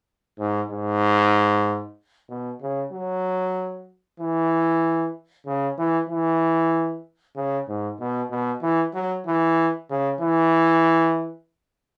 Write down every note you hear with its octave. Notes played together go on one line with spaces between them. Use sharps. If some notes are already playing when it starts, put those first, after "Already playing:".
G#2
G#2
B2
C#3
F#3
E3
C#3
E3
E3
C#3
G#2
B2
B2
E3
F#3
E3
C#3
E3